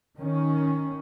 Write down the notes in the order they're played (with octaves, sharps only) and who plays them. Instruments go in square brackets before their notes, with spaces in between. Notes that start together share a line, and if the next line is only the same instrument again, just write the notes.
[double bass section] D#3 C#4